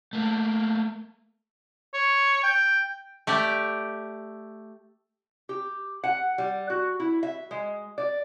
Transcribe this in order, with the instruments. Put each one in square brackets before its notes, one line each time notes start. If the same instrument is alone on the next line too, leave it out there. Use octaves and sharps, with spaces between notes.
[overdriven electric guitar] A3 A#3
[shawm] C#5
G5
[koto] A3 G4 D5
[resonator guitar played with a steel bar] G4
F#5
G3
F#4
E4
E5
G#3
D5